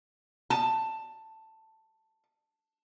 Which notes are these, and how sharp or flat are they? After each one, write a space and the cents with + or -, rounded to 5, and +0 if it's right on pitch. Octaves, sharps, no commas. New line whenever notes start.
A5 +10